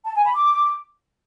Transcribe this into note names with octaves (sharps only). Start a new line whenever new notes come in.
A5
G#5
B5
D6